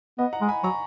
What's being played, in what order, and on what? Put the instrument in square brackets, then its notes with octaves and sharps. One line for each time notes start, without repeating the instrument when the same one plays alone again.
[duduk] B3 [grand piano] D#5
[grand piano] F#5 A#5
[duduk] G#3
[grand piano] G#5 B5
[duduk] F#3 [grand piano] A#5 C#6